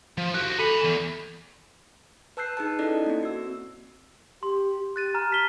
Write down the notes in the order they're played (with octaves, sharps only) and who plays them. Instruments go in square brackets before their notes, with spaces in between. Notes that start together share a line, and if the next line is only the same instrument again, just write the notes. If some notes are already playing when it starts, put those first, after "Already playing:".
[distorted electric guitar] F3
[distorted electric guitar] F#4 G4 [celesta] F#6
[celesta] A4 B6 C#7 [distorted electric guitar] G#5 B5
[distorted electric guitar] E2
[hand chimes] B4 A5 E6 F#6 G6 C7
D#4 G#4 B4 A5
C#4 D#4 E4 A4 D5 D#5
A#3 C4
F#4 E6
[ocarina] G4 [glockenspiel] C6
[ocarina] G4 [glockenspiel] F#6 A6 D#7
[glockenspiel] G#5 A#5 F6
A5 B6 G7